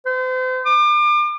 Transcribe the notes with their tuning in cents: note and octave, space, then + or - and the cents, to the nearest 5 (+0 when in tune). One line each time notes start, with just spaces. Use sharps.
C5 -40
D6 +35